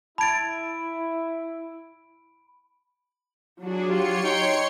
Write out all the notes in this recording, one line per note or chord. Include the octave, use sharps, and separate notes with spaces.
E4 A5 B5 G#6 A6 D7
F#3 D4 F#4 G#4
F4 G4 C#5 C6 C#7
D#4 G5